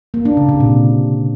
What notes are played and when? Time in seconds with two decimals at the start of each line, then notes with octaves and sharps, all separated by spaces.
0.14 A#3
0.25 D4
0.37 C#3
0.49 C3
0.60 A#2